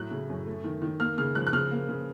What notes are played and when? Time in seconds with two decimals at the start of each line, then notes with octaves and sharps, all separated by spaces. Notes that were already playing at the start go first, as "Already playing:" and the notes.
Already playing: A2 F#3 F#6
0.11 C#3
0.30 F#2
0.46 A3
0.64 D#3
0.82 D#3
1.00 A#3 F6
1.18 C#3 F6
1.35 F3 F#6
1.47 F#6
1.53 C#3 F6
1.71 A#3
1.89 C#3